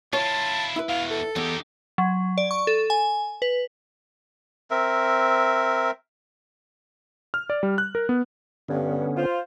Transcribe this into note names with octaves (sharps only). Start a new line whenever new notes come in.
E4 F4 C#5 A5
E4 B4
E2 B2 F5
A4
E2 D#4 G4
F#3
D5
C#6
A4
G#5
B4
C4 A#4 E5
F6
D5
G3
F#6
A#4
B3
G2 D3 B3 C#4
F4 C5